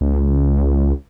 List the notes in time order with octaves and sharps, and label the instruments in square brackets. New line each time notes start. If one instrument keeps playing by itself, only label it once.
[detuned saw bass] C#2